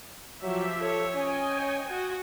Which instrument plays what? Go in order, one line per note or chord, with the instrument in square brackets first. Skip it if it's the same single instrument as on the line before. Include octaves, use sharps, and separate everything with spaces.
[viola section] F3 G4 E5 [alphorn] F#3
[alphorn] A4 [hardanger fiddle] C#5
[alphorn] C#4 [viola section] D#5 G5 G#5
[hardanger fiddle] C#5
F#4